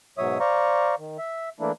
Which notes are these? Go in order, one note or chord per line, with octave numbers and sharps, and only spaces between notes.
G#2 B2 F#3 C#5 E5 D#6
C5 D5 F5 A#5 C#6
D#3
E5
E3 A3 A#3 D4 E4